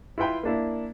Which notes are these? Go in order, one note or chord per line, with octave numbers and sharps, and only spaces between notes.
E4 F4 B4 G5 B5
A#3 D4 E4